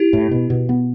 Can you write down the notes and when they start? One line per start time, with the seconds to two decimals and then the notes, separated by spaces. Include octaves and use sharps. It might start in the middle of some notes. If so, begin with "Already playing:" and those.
Already playing: E4 G4
0.13 A2
0.31 B2
0.50 B2
0.69 B3